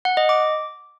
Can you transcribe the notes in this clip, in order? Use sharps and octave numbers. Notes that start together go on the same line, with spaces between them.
F#5
D#5
D6